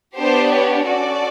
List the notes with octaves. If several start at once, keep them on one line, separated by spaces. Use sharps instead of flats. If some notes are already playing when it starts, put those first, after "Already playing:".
B3 D4 G4 C5
C#5
C#4 F#4 A4 D5